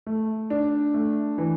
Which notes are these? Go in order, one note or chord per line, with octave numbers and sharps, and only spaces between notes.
A3
D4
A3
E3